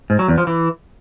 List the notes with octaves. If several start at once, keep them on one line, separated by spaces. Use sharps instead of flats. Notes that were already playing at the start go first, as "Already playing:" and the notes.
G#2
F#3
E2
F3
E3